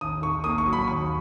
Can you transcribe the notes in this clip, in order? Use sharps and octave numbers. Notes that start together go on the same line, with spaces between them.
D#2 D#6
D#3 C#6
A#3 D#6
C#6
F#3
B5
D#2 C#6